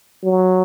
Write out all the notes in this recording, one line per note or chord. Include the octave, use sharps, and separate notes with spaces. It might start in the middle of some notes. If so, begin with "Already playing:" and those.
F#3